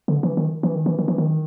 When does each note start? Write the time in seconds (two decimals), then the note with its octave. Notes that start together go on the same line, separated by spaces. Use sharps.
0.08 D3
0.23 E3
0.37 D#3
0.63 E3
0.75 D#3
0.86 E3
0.99 D#3
1.08 E3
1.18 D#3